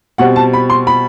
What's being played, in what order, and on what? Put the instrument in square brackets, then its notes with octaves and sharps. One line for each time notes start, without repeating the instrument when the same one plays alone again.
[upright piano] B2 G3 C4 F#5
A5
B5
C6
B5